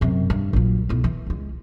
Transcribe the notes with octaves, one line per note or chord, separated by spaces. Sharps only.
F#2 C3
G2
A#1 F#3
B1 E4
E3
C#2 G#3